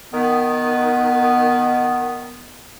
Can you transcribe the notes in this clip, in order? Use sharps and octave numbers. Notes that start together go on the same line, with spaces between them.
D#3 B3